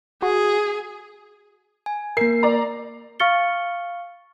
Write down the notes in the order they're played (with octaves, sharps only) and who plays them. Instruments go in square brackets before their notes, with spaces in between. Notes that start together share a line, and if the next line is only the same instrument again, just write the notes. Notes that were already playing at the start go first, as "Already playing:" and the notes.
[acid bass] F#4 [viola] G#4
[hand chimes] G#5
[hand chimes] A#3 A#4 [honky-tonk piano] C7
[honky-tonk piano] D5 A#5
[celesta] F5 C#6 F6 A6 C#7 G7